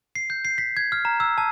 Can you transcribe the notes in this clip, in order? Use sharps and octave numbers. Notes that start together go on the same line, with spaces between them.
C7
G6
C7
B6
G#6
F6
A#5
E6
A5